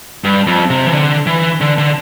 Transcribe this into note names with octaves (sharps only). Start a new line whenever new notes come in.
G2
F2
C3
E3
D3
E3
D3
D3